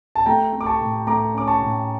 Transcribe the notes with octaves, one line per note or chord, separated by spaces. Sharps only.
A5
A3 G5 A#5
A3
D6
A5 C#6
A2
A3 A#5 D6
C#4 D6
A5 C#6
A2